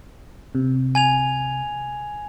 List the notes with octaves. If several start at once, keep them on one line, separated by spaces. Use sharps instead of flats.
C3
G#5 G#6 F7